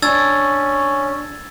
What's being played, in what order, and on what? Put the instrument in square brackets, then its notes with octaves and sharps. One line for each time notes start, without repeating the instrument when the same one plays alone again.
[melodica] C#4 [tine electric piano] D4 [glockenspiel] E6 G#6 A6